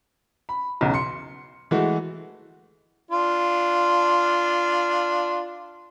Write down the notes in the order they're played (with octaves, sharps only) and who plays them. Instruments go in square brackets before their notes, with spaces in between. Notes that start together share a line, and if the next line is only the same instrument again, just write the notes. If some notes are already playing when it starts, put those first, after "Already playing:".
[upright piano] B5
B1 E2 C#3
C6 C#7
E3 G#3 A3 F#4
[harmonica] D4 F4